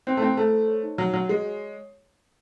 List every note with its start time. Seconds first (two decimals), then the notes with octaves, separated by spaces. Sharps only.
0.07 C4 C5
0.17 A3
0.22 C4 E4
0.37 A3 A4
0.53 C5
0.68 C#5
0.83 D#4
0.98 F#3 C#5
1.13 F#3 F#4
1.28 G#3 C#5
1.44 C#5